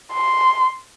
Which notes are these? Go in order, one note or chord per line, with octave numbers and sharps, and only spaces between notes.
C6